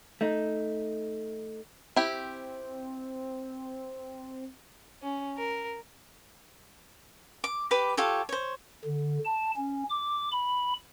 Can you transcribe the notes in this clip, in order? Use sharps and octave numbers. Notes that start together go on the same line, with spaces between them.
A3 D#4
C4 E4 G4
C#4
A#4
D6
G4 B4 B5 D6
F4 G4 A4 C#5
C5 C#5
D3
A5
C#4
D6
B5